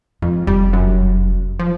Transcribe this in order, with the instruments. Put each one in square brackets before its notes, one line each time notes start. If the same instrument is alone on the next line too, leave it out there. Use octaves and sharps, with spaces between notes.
[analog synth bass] F2 [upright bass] G#3
[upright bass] F1 [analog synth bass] G3
[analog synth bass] F#2
F3